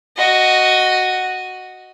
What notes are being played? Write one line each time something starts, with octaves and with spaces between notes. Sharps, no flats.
F#4 D#5